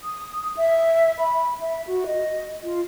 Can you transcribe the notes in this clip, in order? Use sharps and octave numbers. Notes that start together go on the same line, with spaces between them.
D#6
E5
B5
E5
F#4
D#5
F4